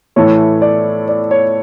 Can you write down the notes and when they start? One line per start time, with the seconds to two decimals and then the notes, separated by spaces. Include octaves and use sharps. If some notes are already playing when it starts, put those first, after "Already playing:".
0.16 A2 E3 A3 C#5
0.62 D5
1.09 D5
1.31 C#5